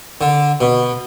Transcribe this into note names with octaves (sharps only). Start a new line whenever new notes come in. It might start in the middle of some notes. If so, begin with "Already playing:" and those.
D3
B2